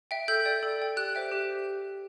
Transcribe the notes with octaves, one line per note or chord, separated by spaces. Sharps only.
E5 G5
A4 G6
D5 G5
A4
D5 G5
G4 F#6
C5 E5 G5
G4